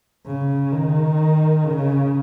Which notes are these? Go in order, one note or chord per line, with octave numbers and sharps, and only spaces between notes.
C#3
D#3
C#3